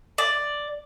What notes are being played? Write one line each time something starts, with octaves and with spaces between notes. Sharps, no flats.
D5